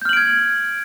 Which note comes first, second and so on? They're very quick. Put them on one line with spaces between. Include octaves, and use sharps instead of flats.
G6 F6 F#7 D7 G#6